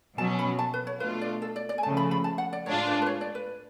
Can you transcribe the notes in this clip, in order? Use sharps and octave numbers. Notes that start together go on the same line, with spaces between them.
B2 F#3 C#4 A5
B5
A5
B4
C#5
B2 A3 D4 F4 B4
D5
A4
D5
D5
G#5
C#3 F3 A3 A5
B5
B5
A5
F#5
D5
A2 G#3 D4 F4 C#5
B4
B4
C#5
D5
B4